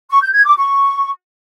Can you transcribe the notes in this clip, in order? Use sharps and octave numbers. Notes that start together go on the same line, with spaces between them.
C#6
G6
G#6
D6
C#6